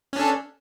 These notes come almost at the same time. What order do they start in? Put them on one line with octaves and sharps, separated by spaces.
C#4 D4 A4